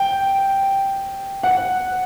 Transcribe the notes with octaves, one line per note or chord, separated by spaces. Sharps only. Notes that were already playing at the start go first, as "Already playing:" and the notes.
Already playing: G5
F#5